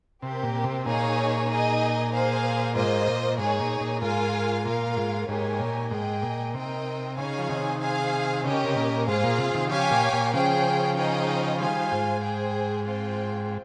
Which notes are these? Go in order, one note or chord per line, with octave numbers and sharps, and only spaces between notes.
C3 C4 G4 A#4
A#2
C3
A#2 D#4 G#4 C#5 F5 G#5
D#4 G#4 D#5
G#4 C5 F5
G#2 A#3 F4 C5 D#5
A#2
G#2 D#4 G#4 C#5
A#2
A#2
G#2 F4 A#4 F5 G#5
A#2 F4 A#4 F5
G#2
G#2 A#3 D#4 G4 C#5 G#5
A#2
G#2 G#4 D#5 G5
A#2
C3 D#4 A#4 D#5 G5
C#3 D#4 G#4 C#5 F5 G#5
F3
C3 D#3
G#4 C5 F5 G#5
C#3 C#4 G4 A#4 D#5
C3
A#2
G#2 F4 G#4 C5 F5
A#2
C3
C3 D#3
C#3 F3 G4 C#5 F5 G#5
A#2
A#2
C#3 F3 C#4 G#4 C5 G5
D#4 G#4 C5 D#5 G5
D#3 G3 F4 C5 F5 G#5
G#2
G#4 C5 G5
C4 F4 C5 G5